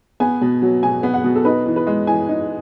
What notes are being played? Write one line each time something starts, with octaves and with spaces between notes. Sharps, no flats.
B3 G#5
B2
F#3
B2 G#5
B3
F#5
B2
A4
D#4 B4
E3
B4
G#3
E3 G#5
D#4